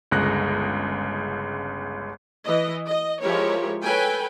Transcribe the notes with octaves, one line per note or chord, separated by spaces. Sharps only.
G1 C#2 G#3 F#6 A#6
E3 D#5
D#5
F3 G#3 E4 G4 A#4 C#5
A4 B4 C#5 G5 G#5